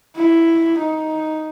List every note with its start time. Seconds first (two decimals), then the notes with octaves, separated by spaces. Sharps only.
0.16 E4
0.77 D#4